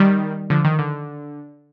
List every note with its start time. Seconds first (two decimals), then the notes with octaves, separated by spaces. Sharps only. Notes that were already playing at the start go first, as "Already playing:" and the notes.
Already playing: D#3 G3
0.50 D3 F3
0.65 D#3
0.79 D3